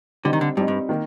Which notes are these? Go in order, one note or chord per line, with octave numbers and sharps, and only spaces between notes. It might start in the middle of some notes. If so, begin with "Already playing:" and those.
D3 G3 C4 D#4
D#3
D3
G2 G3 C4 D#4
G2
D#3 A#3